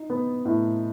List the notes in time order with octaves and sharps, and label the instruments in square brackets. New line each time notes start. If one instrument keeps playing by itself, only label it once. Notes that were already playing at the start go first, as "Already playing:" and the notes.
Already playing: [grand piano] D#4
B3
A2